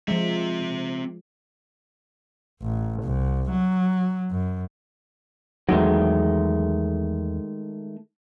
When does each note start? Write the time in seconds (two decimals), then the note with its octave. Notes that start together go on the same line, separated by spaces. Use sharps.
0.08 F3 G#3 C4 E5
2.62 A1
3.03 C2
3.51 F#3
4.31 F#2
5.69 E2 D#3 F#3 G#3 A3